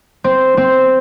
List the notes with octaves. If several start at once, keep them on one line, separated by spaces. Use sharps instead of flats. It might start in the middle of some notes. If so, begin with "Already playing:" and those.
C4
C4